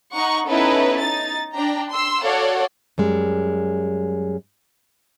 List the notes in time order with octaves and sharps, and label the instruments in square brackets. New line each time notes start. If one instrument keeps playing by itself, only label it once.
[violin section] D#4 F#5 C#6
B3 C#4 D#4 E4 A4 B4
D#4 A6
D4 G5 A#5
C6 E6
F#4 A4 C#5 D5 F5 F#5
[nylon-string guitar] F#2 G3 G#3